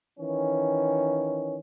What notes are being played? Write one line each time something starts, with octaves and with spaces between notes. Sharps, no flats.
D#3 E3 C#4